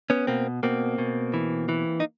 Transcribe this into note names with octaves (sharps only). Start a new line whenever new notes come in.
B3 C#4
B2 A#3 C4
B2 A#3 C4
B2
E3
E3
D#4